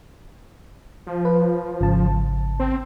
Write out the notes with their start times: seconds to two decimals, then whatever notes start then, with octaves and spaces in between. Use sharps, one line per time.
1.07 F3
1.25 B4
1.80 G#1 C#3 A5
2.60 C4